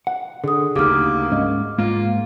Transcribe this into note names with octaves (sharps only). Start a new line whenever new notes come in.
F#5
D3 G#4 D#6
D2 C#3 A#3 D#4 G4 D6 F6
G#2 C#4 D#5
G#2 A#3 F4